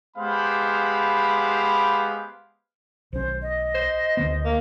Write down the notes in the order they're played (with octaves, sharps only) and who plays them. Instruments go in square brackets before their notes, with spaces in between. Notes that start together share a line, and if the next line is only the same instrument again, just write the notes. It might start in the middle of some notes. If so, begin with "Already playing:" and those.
[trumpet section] G#3 B3 G4 C5 F5 B5
[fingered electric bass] B1 C#4 [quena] C5
[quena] D#5
[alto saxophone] C5
[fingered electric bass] D2 D3 B3
[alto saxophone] A#3